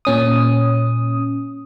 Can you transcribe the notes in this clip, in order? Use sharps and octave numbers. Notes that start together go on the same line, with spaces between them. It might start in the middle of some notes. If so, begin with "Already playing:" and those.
A#2 C#4 D#6